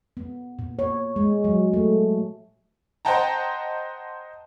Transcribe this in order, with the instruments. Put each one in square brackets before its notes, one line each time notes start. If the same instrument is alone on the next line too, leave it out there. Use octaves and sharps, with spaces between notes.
[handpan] B3
A#2
C#5
G#3
F#3
A3
[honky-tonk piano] C5 D#5 F#5 G5 A5 A#5